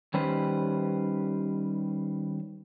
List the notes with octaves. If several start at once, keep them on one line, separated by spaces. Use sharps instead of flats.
D#3 G3 C#4 G4 B4 C5